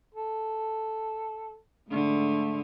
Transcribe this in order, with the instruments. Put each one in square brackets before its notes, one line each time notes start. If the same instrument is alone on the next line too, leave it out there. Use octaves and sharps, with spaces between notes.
[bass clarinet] A4
[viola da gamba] G#2 D3 [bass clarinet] A3